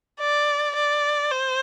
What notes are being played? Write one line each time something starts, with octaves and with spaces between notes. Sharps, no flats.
D5
D5
C5